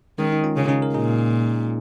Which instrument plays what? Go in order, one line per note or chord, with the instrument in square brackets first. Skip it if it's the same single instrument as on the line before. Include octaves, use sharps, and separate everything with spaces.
[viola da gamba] D#3 [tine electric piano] G#3 C#4
[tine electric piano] D#4
C#4 F4
[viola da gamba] C#3
[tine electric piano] D#4 G#4
A#4
[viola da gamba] A#2 [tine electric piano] D#4 G#4